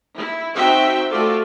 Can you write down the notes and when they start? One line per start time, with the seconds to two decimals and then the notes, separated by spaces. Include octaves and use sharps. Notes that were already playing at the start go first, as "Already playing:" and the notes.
0.15 E4
0.54 C4 D#4 F#4 C5 E5 G5
1.10 A3 F4 F#4 A4 D5